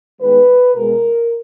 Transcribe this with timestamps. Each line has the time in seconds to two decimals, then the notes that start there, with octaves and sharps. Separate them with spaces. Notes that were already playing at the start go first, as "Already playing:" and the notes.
0.20 D#3 G#3 B3 B4
0.74 B2 G#3 B3 A#4